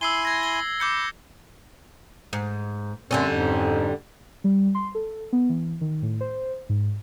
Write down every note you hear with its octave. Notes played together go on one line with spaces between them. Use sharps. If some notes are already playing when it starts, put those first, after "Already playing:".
E4 G#5 C6 E6 C7 G7
G#6 A#6
G7
B5 D6 G6 C#7
G#2
F#2 D3 G3 C4 C#4
F2 G#2
G3
C6
A4
B3
E3
D#3
A2
C5
G#2